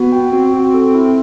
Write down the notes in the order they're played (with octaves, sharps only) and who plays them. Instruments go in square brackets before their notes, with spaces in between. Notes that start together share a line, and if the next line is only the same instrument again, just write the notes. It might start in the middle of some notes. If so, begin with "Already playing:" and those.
Already playing: [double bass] B3 [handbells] F#4
[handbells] G5
[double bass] C4 [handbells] F#4
[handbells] F#4
A4
E4